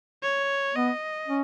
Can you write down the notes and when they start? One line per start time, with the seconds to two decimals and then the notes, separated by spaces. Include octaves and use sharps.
0.22 C#5
0.75 B3 D#5
1.28 C#4